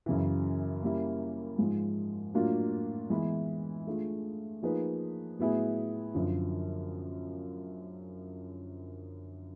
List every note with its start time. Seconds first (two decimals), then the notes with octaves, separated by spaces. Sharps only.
0.06 F#2 C#3 E3
0.83 G3 A#3 C#4 E4
1.58 G#2 F3 G#3
2.34 A2 F#3 A#3 D4 F4
3.10 E3 G#3 B3 E4
3.87 A3 D4 F4 G#4
4.63 F3 A#3 D#4 G#4 B4
5.39 A2 F#3 B3 E4 G#4
6.14 F#2 D3 F3